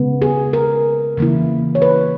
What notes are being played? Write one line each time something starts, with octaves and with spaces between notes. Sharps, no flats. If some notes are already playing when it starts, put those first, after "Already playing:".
Already playing: C#3 G#3 B3
G#4
A#4
C#3 E3 A#3 E4
C#5
B4